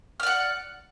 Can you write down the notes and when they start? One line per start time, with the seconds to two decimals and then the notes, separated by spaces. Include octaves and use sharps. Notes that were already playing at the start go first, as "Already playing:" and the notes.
0.20 F6
0.23 D5
0.26 F#5